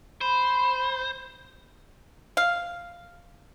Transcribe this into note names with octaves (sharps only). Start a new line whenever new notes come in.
C5 B5
F5